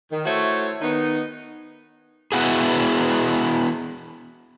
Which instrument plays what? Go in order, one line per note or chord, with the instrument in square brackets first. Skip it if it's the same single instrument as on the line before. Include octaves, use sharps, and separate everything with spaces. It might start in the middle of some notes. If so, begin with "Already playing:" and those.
[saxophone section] D#3
A3 E4 F#4 C5 C#5
D#3 B3 D#4
[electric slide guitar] B3 E4 F#4 G#4